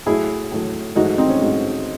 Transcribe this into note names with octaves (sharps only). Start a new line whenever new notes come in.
A2 F#3 A3 E4 G#4
A2 F#3 A3
G#2 F#3 A3 D#4 F#4
C4 D#4
C#4
G#2 F#3 A3